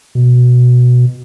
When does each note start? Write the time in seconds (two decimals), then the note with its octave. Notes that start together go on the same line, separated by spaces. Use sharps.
0.15 B2